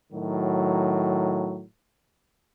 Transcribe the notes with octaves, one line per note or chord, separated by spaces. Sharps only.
A2 D#3 F#3